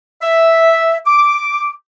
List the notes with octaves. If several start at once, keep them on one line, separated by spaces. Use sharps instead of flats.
E5
D6